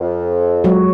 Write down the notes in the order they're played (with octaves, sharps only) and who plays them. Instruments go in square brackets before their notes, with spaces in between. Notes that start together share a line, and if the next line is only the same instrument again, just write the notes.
[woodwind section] F2
[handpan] F#3 G#3 F#4